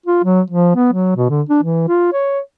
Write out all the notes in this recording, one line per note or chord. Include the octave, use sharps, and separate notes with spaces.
F4
F#3
F3
B3
F#3
B2
D3
D4
E3
F4
C#5